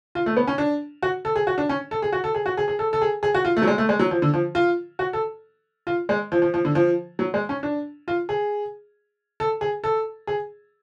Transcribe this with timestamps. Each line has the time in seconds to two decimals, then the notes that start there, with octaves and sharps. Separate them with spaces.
0.15 F4
0.26 A3
0.37 B3
0.47 C#4
0.58 D4
1.03 F#4
1.25 A4
1.36 G#4
1.47 F#4
1.58 D4
1.69 C#4
1.91 A4
2.02 G#4
2.13 F#4
2.24 A4
2.35 G#4
2.46 F#4
2.57 G#4
2.68 G#4
2.79 A4
2.93 A4
3.01 G#4
3.23 G#4
3.35 F#4
3.45 F4
3.57 A3
3.62 F#3
3.67 G#3
3.78 A3
3.89 G#3
3.99 F#3
4.11 F3
4.22 D3
4.34 F3
4.55 F4
4.99 F#4
5.13 A4
5.87 F4
6.09 G#3
6.32 F3
6.42 F3
6.54 F3
6.65 D3
6.75 F3
7.19 F#3
7.34 G#3
7.49 C#4
7.63 D4
8.08 F4
8.29 G#4
9.40 A4
9.61 G#4
9.84 A4
10.27 G#4